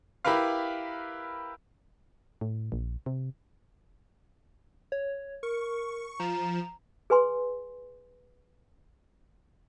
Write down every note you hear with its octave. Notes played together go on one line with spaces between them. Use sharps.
E4 G4 A#4 B4 F5
A2
A#1
C3
C#5
A#4 C#6
F3 A#5 E7
G#4 B4 G#5 C6